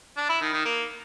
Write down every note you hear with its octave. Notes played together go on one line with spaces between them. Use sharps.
D4
E4
D#3
D#3
A#3